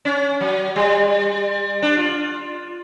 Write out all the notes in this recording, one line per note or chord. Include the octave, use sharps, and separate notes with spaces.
C#4
F#3
G3
D4
F4